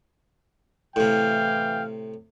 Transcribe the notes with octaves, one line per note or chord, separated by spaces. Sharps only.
A2 C3 E3 F5 G5